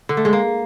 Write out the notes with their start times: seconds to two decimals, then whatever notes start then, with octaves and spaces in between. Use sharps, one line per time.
0.09 D3
0.17 A3
0.25 G#3
0.33 A#3